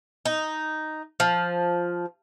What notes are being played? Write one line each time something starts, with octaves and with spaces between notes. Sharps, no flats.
D#4
F3